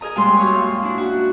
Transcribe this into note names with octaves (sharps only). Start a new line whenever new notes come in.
G#4 A#4 D#5 A#5
A#2 G3 G#3 C#4 C6
F#2 C#5 C#6
F5
D4 E4
F#4